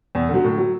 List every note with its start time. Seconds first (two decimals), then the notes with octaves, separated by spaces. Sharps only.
0.15 E2
0.29 D3 F#3
0.44 A2
0.58 F#3